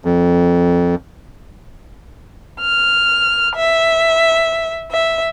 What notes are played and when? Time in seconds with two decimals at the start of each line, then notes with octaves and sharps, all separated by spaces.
0.05 F2
2.61 F6
3.55 E5
4.91 E5